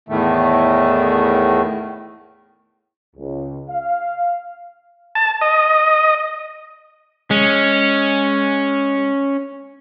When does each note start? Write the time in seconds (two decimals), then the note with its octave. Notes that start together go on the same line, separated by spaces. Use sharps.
0.09 E2 A2 D#3 A3
3.16 C#2
3.69 F5
5.15 A5
5.41 D#5
7.31 G#3 C#4